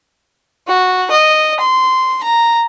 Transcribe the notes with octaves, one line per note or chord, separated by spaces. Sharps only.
F#4
D#5
C6
A#5